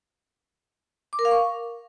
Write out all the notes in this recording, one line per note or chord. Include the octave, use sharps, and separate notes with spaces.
D6
A#4
F5
C#6